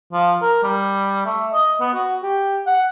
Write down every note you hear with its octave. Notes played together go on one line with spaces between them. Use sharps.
F3
A#4
G3
A3
D#5
B3
F#4
G4
F#5